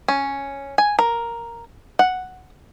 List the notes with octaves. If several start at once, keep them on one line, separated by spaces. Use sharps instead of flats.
C#4
G#5
A#4
F#5